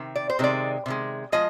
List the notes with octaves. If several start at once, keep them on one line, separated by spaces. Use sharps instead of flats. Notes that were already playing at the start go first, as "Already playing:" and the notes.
Already playing: C3 D#3
D5
C5
C3 D#3 G#3 D5
C3 D#3 G#3
F3 G#3 D#5